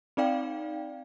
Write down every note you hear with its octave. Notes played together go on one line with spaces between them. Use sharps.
C4 D#4 D5 F5 G5